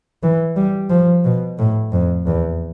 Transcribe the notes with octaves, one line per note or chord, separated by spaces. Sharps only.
E3
G3
F3
B2
A2
F2
E2